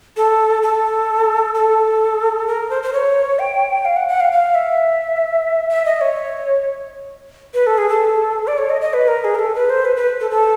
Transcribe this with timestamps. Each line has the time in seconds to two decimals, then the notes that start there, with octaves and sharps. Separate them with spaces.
0.17 A4
0.62 A4
1.54 A4
2.47 A#4
2.70 C5
2.83 C5
2.93 C#5
3.39 G5
3.85 F5
3.96 F#5
4.08 F#5
4.20 F5
4.32 F5
4.55 E5
5.69 E5
5.85 D#5
6.01 C#5
7.54 B4
7.67 A4
7.78 G#4
7.89 A4
8.47 D5
8.58 C#5
8.69 D#5
8.81 D#5
8.93 B4
9.08 A#4
9.24 G#4
9.35 A#4
9.39 A4
9.55 B4
9.70 C5
9.85 B4
9.96 B4
10.20 A4
10.31 A4